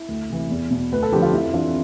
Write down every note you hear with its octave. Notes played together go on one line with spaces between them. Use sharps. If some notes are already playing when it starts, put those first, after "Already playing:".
Already playing: E4
D2
C3 E3
E2
B2
D2 B4
A4
D3 F3 G4
F4
F2 E4
E3 D4 F4